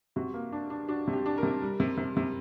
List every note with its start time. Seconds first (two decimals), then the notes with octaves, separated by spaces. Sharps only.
0.16 C3 F#4
0.34 A#3
0.52 D4
0.70 D4
0.88 D4 F#4
1.07 C3
1.13 G4
1.26 D4
1.38 A#4
1.43 C3
1.62 G3
1.80 C3
1.97 C3
2.17 C3